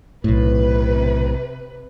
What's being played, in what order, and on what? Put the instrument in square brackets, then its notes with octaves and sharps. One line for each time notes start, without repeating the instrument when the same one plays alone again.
[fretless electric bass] B1 A2 [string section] C3 B4